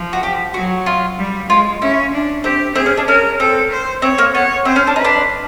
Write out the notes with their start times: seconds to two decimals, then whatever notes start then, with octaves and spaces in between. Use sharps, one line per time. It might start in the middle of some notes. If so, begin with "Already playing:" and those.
Already playing: F3
0.13 F#4
0.23 G4
0.54 F#3 F#4
0.86 F4
1.18 G3
1.49 G#3 F4
1.82 C#4 E4
2.13 D4
2.44 C4 G4
2.75 C4 G#4
2.86 C#4
2.97 D4
3.08 C#4 A#4
3.39 C4 A4
3.71 C5
4.02 C4 C#5
4.18 A#3
4.34 B3 C#5
4.65 C4 C5
4.76 C#4
4.87 D4
4.96 D#4 B4
5.04 D4